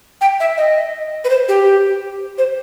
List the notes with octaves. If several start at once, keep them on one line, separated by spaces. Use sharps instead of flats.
G5
E5
D#5
B4
C5
G4
C5